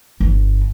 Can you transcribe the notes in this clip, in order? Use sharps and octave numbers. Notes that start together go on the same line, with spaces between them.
G1